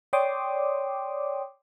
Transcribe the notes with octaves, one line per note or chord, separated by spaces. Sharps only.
C#5 D5 G5 C6 D6 D#6